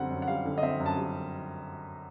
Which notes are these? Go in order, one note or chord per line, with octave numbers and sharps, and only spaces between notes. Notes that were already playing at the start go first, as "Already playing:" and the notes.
Already playing: F#2 D3 G3 C4 F#5
F#2
F#5
G3 F5
D3
D#5
C4 E5
F#2
A5
G3